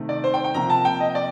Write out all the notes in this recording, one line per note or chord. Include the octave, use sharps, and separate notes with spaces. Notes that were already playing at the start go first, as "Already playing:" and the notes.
Already playing: C3 D#3 A3
D5
C5
G5
G5
C3 F3 A#3 A#5
A5
G5
D#5
D5